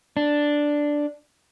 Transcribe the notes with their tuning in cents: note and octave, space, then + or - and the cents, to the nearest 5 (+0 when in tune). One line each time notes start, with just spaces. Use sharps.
D4 +0